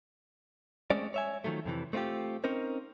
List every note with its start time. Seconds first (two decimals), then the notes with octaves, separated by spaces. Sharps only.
0.90 G#3 A3 C4 C#4 D5
1.14 C#5 E5 G#5
1.44 D#3 F3 F#3 A3
1.65 F2 C3 E3
1.93 A3 C4 D#4 F4 G4
2.44 C4 C#4 D#4 A#4 C5